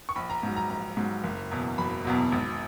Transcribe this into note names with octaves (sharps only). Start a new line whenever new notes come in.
C#6
A#1 B5
A#5
G#2 F#3
A#5
A#1 A#5
G#2 F#3
F#1
E2 B2 F#3
F#1 B5
E2 B2 F#3
G#1